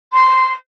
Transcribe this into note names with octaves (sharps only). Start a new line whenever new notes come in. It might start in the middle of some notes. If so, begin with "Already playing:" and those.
C6